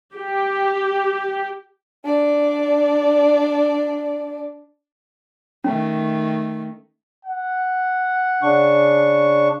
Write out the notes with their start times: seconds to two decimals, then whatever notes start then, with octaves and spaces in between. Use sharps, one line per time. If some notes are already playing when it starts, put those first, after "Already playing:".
0.15 G4
2.04 D4 D5
5.64 D#3 A3 C#4
7.25 F#5
8.43 C#3 D4 C#6